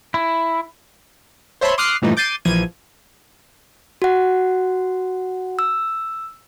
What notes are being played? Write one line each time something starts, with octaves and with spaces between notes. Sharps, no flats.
E4
C5 C#5 E5 A5 B5 C6
C6 D6 D#6 F6 F#6 C7
G2 A#2 E3 F3 A3 D#4
D6 G6 A6 C7 D#7
A#1 E3 F3 G#6 D#7
F#4 F#5
E6